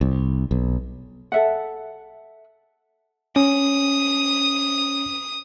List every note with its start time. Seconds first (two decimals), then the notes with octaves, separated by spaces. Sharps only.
0.01 C2
0.51 B1
1.32 A4 E5 F#5
3.36 C#4 D#6